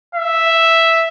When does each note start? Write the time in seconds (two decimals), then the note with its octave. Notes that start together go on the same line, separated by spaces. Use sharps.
0.15 E5